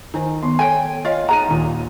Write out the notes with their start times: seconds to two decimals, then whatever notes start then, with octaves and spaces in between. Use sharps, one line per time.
0.14 D#3 C5 G#5 A#5
0.43 D#3 B3 C6
0.59 A4 C#5 G5 G#5
1.05 F4 C#5 D#5 F5
1.29 D#4 G#4 F#5 A#5 D#7
1.48 D#2 A#2